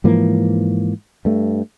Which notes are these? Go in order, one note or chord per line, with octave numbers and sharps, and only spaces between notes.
G#2 E3 F3 A#3
G2 A3